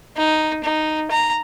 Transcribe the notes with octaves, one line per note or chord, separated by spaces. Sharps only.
D#4
D#4
A#5